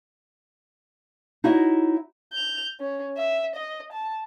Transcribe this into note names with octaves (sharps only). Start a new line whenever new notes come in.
D#4 E4 F#4 C#5 D#5 E5
G6 F7
C#4
E5
D#5
A5